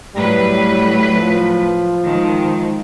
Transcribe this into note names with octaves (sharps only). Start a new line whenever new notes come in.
A2 F#3 G3 B4
F3
D#3 G#3